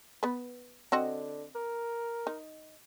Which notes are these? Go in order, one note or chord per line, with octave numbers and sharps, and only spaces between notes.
B3 B4
D3 C4 F#4 D#5
A#4
D#4